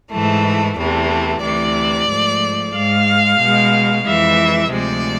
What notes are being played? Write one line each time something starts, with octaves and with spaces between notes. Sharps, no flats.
G#2 E3 A3
E2 C3 E3 A3
D2 C3 E3 D5
G#2 F3 A3
G#2 G#3 F5
B2 G#3
F2 E3 G#3 E5
D2 C3 F3 G#3 D5